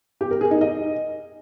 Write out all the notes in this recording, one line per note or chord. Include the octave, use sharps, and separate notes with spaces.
G4
A#4
G#4
D#4
D#5